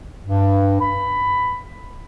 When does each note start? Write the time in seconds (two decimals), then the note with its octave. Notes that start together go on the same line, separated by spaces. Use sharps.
0.24 G2
0.81 B5